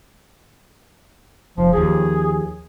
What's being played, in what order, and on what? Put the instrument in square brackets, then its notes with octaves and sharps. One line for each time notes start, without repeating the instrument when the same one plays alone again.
[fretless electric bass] F1 [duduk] F3
[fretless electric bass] D#2 F3 [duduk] G#4